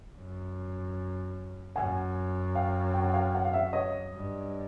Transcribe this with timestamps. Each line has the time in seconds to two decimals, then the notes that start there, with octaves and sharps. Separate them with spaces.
0.17 F#2
1.76 F#2 F#5 G#5
2.55 F5 G5
2.94 G5
3.04 F#5
3.14 F5 G5
3.35 F#5
3.45 F5
3.53 E5 F#5
3.73 C#5 D#5
4.14 G2